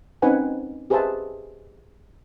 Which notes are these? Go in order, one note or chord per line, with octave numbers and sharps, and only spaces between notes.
C4 C#4 D#4 B4 F#5 G#5
G4 G#4 B4 C5 E5 A5